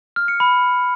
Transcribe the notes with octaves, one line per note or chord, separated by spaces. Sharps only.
F6
C#7
B5